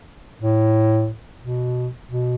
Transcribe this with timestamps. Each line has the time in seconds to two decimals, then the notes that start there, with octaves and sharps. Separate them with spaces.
0.43 A2
1.43 B2
2.10 B2